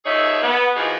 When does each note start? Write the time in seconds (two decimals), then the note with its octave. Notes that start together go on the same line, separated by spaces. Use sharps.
0.05 D#2 F3 D#4 G#4 C#5 E5
0.43 B3
0.76 E3 F3 A#3 D#4 F#4 G#4